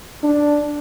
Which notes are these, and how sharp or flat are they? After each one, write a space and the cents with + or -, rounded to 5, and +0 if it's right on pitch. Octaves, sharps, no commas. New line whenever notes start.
D4 +0